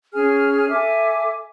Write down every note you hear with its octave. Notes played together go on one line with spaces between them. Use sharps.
C#4 G#4 G#5 F6
A4 E5 G#5 D6